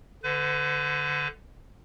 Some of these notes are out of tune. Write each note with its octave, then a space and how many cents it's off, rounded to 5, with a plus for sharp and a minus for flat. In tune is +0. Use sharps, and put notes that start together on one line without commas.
D3 +0 B4 +40